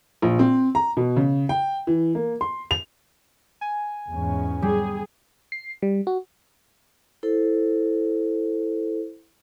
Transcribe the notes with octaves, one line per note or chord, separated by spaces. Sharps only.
A#1
C4
A#5
B2
C#3
G5
E3
A#3
C6
F7
G#5
E2 G#2 C#4
G3 G#4
C7
G3
F#4
E4 A4 C5